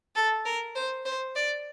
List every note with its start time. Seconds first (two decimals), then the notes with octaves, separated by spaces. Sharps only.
0.15 A4
0.45 A#4
0.75 C5
1.05 C5
1.35 D5